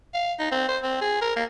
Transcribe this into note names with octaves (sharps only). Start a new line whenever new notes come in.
F5
D#4
C4
C5
C4
G#4
A#4
A#3